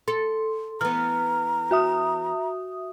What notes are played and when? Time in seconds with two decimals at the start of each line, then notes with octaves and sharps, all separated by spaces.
0.08 A4 C6
0.81 E3 B3 A#5 F6
1.71 F#4 E5 D#6